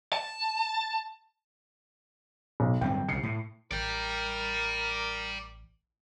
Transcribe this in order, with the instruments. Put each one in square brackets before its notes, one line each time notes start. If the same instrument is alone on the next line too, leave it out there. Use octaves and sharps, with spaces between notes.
[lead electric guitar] A5
[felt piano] B1
[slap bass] D1 G2 C4 [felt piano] G5
[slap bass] C2 C#3 [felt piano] C7 C#7
[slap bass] A2
[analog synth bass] A1 [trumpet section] A#4 [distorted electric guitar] D5 G5